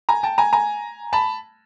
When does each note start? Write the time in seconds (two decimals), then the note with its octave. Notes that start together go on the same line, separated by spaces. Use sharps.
0.09 G#5 A#5
0.23 G5 A5
0.38 G#5 A#5
0.53 G#5 A#5
1.13 A5 B5